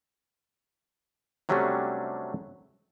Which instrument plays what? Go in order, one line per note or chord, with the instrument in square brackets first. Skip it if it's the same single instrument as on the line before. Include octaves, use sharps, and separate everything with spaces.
[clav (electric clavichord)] C3 F#3 G3 A3 C#4 D4